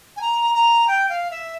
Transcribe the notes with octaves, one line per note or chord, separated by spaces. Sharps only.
G#5
A#5
A#5
G5
F5
E5